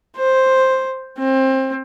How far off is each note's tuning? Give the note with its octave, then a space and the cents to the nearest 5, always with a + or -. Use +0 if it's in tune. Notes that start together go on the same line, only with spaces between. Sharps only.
C5 +5
C4 +25